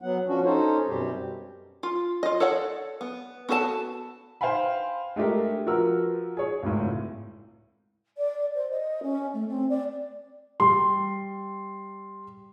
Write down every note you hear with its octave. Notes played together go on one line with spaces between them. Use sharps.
F#3 B3 F#5
F3 C#4 D4 F#4
C#4 D#4 A4 C5 C#5
F#2 B2 G3 C4 G4
F4
F4 D#5
A4 C#5 D5 F#5
B3
B3 F#4 A4 C5 A5
C5 F5 G5 G#5 B5
G#3 A3 D4 G4 A#4
F3 F#4 A#4 B4 F#5 E6
G#4 C#5
G#1 C#2 A2
D5
C5
D#5
C#4
A3
C4
D5
G3 C6